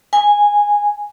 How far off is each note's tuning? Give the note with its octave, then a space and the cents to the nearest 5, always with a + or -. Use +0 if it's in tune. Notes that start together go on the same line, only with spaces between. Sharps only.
G#5 -10